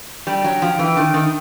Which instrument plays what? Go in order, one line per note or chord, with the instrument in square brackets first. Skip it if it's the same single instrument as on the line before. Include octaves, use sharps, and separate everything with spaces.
[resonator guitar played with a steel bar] G3 [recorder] G5
[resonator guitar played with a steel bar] F#3
F3
[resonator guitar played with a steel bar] E3 [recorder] G5
[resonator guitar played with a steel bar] D#3
D#3